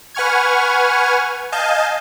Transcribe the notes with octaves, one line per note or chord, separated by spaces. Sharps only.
B4 F#5 G#5 C#6 F6 G#6
D#5 F5 G#5 A5 G6